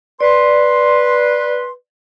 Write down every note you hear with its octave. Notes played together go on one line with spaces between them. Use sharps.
B4 D5 C6